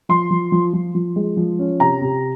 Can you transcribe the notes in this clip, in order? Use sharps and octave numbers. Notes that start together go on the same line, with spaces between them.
F3 C6
F3
F3
F3
F3
G#3
F3
C#4
C3 A#5
C3